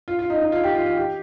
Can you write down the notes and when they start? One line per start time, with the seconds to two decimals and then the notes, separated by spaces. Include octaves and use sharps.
0.08 F4
0.19 F4
0.30 D#4
0.42 D#4
0.52 F4
0.64 G4
0.75 F4
0.86 F4
0.97 G4